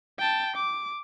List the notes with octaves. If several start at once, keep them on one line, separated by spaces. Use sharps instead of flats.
G5 A5
D6